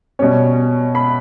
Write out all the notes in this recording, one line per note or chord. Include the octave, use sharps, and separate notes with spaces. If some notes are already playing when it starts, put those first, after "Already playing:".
B2 G3 C#4 C#5
B5